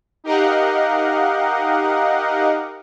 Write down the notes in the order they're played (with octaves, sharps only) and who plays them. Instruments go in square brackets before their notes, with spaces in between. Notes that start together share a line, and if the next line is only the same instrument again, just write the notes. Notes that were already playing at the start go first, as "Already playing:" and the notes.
[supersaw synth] D#4 G4 A#4 D#5 F5 F#5